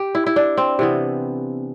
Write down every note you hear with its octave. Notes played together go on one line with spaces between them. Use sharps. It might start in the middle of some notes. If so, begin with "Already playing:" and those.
Already playing: G4
E4
E4
D4
C4
C3 E3 B3